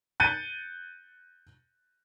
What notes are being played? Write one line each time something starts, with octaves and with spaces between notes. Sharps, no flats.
F#6 G6 A6 C#7 D#7